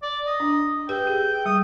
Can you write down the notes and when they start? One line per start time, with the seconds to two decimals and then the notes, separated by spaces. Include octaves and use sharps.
0.02 D5
0.26 D#5
0.40 D4
0.89 G4 B4 G5
1.07 G#4
1.45 G3 D#6